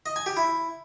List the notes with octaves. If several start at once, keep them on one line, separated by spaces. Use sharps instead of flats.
D#5
G#5
G4
E4